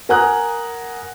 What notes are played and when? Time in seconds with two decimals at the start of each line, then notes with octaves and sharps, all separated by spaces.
0.09 A#4 F#5 G#5 A#5 D#6 F#6